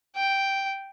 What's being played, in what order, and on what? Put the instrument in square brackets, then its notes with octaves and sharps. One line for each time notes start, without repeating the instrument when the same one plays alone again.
[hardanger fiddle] G5